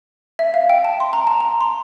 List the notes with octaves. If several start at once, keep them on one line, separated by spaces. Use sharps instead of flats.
E5
F5
G5
A5
C6
A#5
A5
A#5
C6